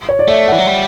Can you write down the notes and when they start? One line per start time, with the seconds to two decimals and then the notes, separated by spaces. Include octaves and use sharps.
0.09 C#5
0.19 D5
0.28 A3 E5
0.48 E3 F#5
0.59 F#3
0.67 G3